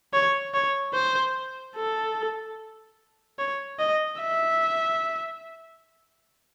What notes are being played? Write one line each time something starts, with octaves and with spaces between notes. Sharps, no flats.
C#5
C#5
C5
A4
C#5
D#5
E5